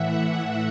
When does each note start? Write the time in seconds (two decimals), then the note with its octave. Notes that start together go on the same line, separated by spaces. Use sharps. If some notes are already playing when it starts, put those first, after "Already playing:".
Already playing: A2 E3 E5 F#5